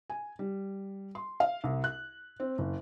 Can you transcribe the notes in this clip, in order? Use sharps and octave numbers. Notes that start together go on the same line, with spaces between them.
G#5
G3
C6
F5
C2
F#6
C4
F#1